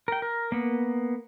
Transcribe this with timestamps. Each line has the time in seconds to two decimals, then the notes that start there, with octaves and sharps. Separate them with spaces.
0.08 A#4 G5
0.22 A#4
0.52 A#3 B3